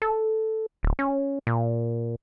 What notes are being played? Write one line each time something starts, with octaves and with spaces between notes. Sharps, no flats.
A4
D1
C#4
A#2